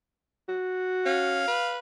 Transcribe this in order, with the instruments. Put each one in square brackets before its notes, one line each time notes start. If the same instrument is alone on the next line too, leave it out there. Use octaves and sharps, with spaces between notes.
[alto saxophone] F#4
[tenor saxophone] C#4 [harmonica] F5
[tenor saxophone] B4